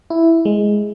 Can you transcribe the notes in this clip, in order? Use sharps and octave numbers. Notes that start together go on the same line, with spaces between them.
E4
G#3